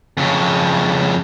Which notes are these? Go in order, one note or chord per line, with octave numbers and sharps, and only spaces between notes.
F2 C#3